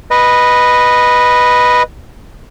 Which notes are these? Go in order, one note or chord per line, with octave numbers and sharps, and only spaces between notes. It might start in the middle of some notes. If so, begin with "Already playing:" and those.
B4 D#5